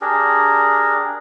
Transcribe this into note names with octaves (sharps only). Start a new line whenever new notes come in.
D4 G4 G#4 A#4